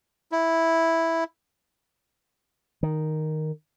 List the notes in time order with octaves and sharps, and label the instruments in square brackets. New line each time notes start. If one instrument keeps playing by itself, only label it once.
[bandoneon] E4
[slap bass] D#3